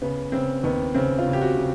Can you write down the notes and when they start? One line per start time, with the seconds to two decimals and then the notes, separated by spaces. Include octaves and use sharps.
0.02 C#3 B3
0.32 C#3 C4
0.63 D#2 B3
0.94 C#3 C4
1.18 F4
1.26 C#3
1.33 G4
1.41 F#4
1.57 C#3